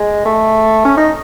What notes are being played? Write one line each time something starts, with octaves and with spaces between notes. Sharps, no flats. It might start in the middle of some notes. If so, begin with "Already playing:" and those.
Already playing: G#3
A3
C#4
D#4